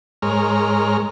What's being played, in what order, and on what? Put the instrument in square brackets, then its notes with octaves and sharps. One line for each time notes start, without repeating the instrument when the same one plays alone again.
[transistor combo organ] G#2 G#3 A#4 C#5 F6